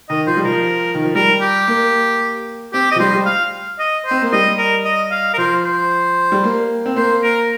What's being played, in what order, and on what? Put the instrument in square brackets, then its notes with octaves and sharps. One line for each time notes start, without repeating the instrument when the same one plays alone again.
[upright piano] D#3 [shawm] D#5
[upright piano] F3 [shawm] C5
[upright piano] G3
[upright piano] F3 [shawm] A#4
[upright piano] D#3
F3
[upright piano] G3 [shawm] A#4
[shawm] G4
[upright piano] A#3
[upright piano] C4 [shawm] G4
[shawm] D#5
[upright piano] F3
[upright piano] G3 [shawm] C5
[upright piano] G3
[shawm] F5
D#5
C5
[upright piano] C4
A#3
[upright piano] G3 [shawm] D#5
[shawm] A#4
D#5
F5
A#4
[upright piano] F3 [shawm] C5
[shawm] C5
[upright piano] G3
A#3
C4
[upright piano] A#3 [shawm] C5
[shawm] A#4